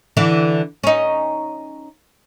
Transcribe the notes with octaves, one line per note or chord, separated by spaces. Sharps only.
D3 E3 E4
C#4 D#4